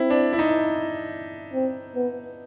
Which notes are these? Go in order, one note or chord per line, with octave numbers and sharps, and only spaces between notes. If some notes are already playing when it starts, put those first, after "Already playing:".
Already playing: C4 E4
D4
E4
D#4
C4
B3